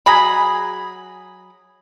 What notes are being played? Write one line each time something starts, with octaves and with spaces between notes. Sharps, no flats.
F#3 G#4 B5